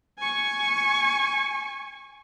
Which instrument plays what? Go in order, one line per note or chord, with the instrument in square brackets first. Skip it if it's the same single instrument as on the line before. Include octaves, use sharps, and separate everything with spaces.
[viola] G#5 C#6